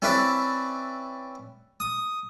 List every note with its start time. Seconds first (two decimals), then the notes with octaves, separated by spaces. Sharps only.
0.02 C4 C#4 E4 B4 D5
1.80 D#6